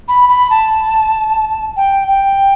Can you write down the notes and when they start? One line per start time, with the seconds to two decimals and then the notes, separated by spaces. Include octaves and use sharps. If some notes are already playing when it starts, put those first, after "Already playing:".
0.08 B5
0.29 B5
0.50 A5
1.77 G5
2.08 G5